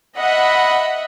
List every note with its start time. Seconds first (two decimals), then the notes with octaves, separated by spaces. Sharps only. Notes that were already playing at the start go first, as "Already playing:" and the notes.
0.16 D#5 E5 F#5 B5